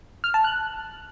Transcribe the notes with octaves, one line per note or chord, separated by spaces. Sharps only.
F6
A5
F#6